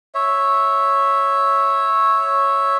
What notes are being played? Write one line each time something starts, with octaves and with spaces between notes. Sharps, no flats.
C#5 E5